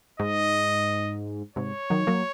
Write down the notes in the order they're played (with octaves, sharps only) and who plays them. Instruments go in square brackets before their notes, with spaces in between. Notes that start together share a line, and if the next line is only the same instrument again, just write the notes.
[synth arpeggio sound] G#2 [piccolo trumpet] D#5
[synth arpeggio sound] G#2 C3 [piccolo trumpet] C#5
[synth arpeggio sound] D#3 F#3
F#3 A#3